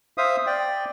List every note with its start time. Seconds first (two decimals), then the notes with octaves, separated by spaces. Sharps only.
0.18 C5 E5 F5 D#6
0.47 D5 G5